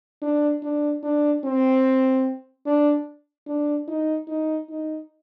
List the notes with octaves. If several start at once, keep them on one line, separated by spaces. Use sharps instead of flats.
D4
D4
D4
C4
D4
D4
D#4
D#4
D#4